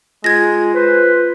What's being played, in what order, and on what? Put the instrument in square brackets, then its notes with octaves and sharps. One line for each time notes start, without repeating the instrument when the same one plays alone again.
[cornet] G#3 [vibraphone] F4 [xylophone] G#6 A#6
[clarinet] B4 [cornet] C5